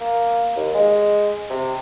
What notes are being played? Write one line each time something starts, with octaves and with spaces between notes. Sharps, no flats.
A#3
D#2
G#3
C3